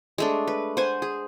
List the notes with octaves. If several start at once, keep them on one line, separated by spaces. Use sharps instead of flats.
G#3 A3 D4
B4
C5 F#5 G#5
G#4